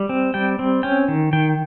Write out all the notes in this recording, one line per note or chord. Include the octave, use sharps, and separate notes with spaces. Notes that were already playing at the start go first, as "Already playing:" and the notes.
Already playing: G3
C4
G3 G5
C4
C#4 G5
D#3
D#3 G5